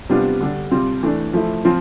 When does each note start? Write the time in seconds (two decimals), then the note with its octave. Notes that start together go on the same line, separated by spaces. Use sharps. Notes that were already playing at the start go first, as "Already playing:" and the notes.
0.09 C3 G3 B3 D4 F4
0.41 D3 G3 D4
0.71 C3 G3 C4 F4
1.03 E3 A3 D4
1.33 F3 A3 E4
1.65 F3 C4 F4